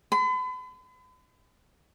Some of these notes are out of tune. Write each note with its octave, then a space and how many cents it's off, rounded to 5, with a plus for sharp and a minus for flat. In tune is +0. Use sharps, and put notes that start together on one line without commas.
B5 +40